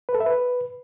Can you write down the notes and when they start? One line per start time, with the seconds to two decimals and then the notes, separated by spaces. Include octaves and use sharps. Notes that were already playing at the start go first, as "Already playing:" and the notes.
0.09 B4
0.15 A4
0.20 E5
0.26 B4